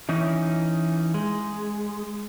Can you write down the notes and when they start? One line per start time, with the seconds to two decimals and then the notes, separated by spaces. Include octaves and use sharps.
0.09 E3 C#4 D#4
1.14 G#3